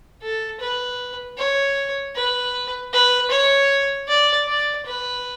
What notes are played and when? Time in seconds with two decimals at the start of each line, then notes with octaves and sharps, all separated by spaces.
0.22 A4
0.60 B4
1.38 C#5
2.15 B4
2.93 B4
3.31 C#5
4.08 D5
4.47 D5
4.86 B4